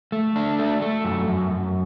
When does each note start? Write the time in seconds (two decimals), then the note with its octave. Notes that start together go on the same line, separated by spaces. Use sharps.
0.12 A3
0.36 D4
0.59 A3
0.82 A3
1.05 F#2
1.28 F#2
1.51 F#2